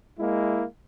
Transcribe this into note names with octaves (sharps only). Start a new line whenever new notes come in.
G#3 A#3 E4